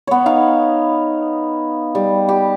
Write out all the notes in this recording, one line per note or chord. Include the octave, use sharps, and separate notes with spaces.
B3 C#5
D#4 F5
G3
G4